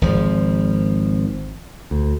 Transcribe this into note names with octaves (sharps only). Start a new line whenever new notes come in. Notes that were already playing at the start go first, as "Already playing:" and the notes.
G#1 F3
D2